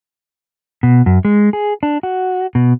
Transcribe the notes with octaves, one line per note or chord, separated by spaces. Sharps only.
B2
F#2
G#3
G#4
D4
F#4
B2